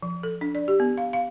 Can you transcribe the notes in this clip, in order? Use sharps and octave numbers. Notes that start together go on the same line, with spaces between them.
F3
A4
D4
D5
G4
B3
F5
F5